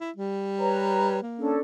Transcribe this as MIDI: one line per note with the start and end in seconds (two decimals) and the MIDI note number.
0.01 0.11 64
0.17 1.21 55
0.59 1.17 71
0.59 1.17 73
0.59 1.17 82
1.23 1.55 58
1.38 1.59 61
1.38 1.59 62
1.38 1.59 69